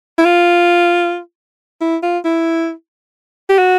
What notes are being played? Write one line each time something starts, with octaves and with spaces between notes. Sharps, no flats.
E4
F4
E4
F4
E4
G4
F#4